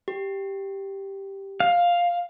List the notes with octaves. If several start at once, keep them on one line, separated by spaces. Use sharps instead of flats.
G4
F5